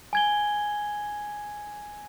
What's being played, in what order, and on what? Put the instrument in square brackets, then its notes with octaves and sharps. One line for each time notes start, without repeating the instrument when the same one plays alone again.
[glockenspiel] G#5 G#6 G7